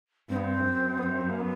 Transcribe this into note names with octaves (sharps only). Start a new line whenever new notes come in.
G2 C4
B3
C4
F#2
B3
C4
A#3
B3